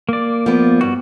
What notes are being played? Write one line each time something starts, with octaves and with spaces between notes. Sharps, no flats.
A#3 D5
F3 B3
G2 G3 F#4